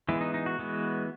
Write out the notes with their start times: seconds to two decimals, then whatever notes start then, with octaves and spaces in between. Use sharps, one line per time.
0.09 E3 G#3 B3 E4
0.21 D#4
0.34 D#4
0.46 F#4
0.59 E3 G#3 B3